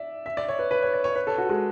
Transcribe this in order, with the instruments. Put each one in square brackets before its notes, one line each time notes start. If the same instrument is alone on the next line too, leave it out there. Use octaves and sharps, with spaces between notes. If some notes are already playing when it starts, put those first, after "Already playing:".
Already playing: [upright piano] D5 E5
E5
D5
C#5
B4
B4
C#5
D5
C#5
B4
A4
F#4
G#3